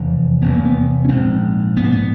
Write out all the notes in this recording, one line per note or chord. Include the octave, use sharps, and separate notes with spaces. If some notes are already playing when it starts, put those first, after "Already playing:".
Already playing: F1 E2 C3
F1 E2 C3 B3
A#3
B3
C#4
A#1 G#2 C4
A#1 G#2 B3
A#3
B3